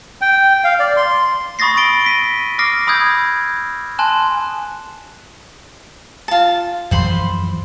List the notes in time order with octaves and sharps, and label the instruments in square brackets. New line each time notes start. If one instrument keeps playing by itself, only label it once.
[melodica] G5
F5
D5
C6
[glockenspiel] B5 C#6 D#6 A6 A#6 C7
D#6 E6 A6 D7 G7
A#6 B6 D#7
D6 D#6 F6 A#6 C7 D7
B5 D#6 E6 G6 G#6 A#6
G#5 A5 C6 F#6 E7
[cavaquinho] F4 A5
[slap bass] F#2 E3 F3 [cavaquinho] C5 B5 C6